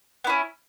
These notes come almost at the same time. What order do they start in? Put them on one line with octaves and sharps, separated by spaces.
B3 E4 C#4